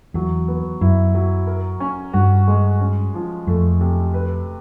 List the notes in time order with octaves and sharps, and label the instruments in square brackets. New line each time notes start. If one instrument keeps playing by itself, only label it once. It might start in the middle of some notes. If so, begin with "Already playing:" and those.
[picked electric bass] E2 [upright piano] F#3
[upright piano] B3
[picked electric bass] F#2 [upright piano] E4
[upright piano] F#3
A#4
C#4
[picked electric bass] G2 [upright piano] F#4
[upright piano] G#3
C#4
F3
[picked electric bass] F2 [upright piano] A3
[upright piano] C3
B4